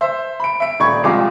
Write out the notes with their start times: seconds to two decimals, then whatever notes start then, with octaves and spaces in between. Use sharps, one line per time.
0.01 C5 E5 E6
0.40 B5 D7
0.60 E5 D7
0.80 D#1 D5 B5 C#6 G#6
1.03 C2 F2 G#3 F4 D6 C7